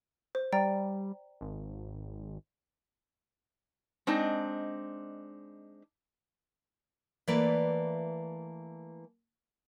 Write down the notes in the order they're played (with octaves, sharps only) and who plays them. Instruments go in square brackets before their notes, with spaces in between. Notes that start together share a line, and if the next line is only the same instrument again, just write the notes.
[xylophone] C5
[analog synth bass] G3 [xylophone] D5 G5 A#5
[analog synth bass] G#1
[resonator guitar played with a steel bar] G#3 C4 D4 D#4 D#5
[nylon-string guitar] E3 A3 A#3 E4 B4 D5